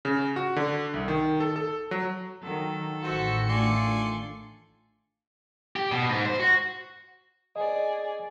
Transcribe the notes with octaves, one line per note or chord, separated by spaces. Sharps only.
C#3
F#4
D3
C2
D#3
A4
A4
F#3
D#3 F#3 A4
A1 D#3 F#4 C5 E5 C#7
A3 D4 F4 D5 G#5 C6
G4
B2
G#2
C5
F#4
G#4 D5 D#5